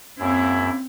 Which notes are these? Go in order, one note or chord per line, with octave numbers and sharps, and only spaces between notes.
F#2 C#3 A#3 C4 E4